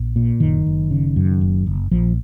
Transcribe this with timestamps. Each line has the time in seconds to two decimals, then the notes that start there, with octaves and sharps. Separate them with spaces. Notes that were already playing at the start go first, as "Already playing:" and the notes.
Already playing: A#1
0.16 A#2
0.40 F#1 D#3
0.66 F#1
0.91 C#3
1.16 F#2
1.41 F#1
1.66 F#1
1.91 A#1 F3